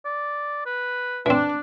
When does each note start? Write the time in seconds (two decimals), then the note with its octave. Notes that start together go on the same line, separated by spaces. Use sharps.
0.05 D5
0.66 B4
1.26 E3 C4 D4